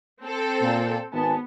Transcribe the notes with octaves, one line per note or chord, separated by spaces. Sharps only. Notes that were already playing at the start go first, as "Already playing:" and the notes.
C4 A4
A#2
G#1 B3 G#5 A5